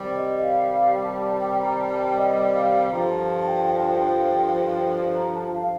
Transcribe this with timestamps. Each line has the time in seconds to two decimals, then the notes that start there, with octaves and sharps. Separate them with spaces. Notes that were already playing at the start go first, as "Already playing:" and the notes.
Already playing: C3 D#3 G3
0.16 D#5
0.41 F5
0.66 F5
1.04 A5
1.41 G5
1.60 A#5
1.79 A5
1.98 G5
2.17 D#5
2.53 F5
2.91 G2 D3 F3 A#5
3.09 A5
3.28 A5
3.47 G5
3.66 G5
3.76 A5
3.85 G5
5.15 A#5
5.34 A5
5.53 F5